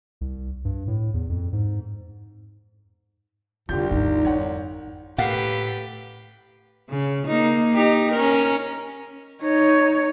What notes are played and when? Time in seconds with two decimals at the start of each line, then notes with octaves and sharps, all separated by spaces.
0.21 C2
0.65 G2
0.87 A2
1.14 E2
1.30 F2
1.52 G#2
3.69 F1 C2 D3 F4 G4 G6
3.91 G#1 D#2 D#4
4.25 F2 C#5 F#5
5.18 A2 A#3 G4 B4 F5 F#5
6.89 C#3
7.26 A#3 D#4
7.74 D#4 G4
8.12 C#4 A#4
9.42 D#4 C#5